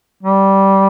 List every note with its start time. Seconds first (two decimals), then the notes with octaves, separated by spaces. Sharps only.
0.23 G3